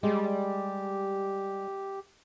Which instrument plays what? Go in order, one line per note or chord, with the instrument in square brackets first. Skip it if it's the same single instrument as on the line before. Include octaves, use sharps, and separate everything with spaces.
[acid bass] G3 [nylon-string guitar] G#3 [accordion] G4